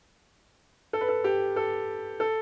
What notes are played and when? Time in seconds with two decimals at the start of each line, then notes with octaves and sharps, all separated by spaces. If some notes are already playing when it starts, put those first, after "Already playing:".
0.93 A4
1.01 B4
1.09 A4
1.24 G4
1.56 A4
2.20 A4